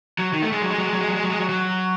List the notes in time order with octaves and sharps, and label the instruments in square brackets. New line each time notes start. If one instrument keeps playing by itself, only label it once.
[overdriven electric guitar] F#3
D#3
A3
G#3
F#3
G#3
F#3
G#3
F#3
G#3
F#3
G#3
F#3
G#3
F#3
F#3